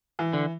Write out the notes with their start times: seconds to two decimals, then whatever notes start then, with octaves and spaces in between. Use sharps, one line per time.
0.19 E3
0.33 D3